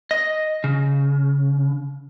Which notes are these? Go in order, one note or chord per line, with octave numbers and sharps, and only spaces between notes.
D#5
C#3